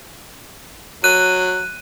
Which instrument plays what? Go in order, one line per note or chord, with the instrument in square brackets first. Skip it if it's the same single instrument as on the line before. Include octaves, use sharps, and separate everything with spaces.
[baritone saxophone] F#3 [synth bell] F#6 D#7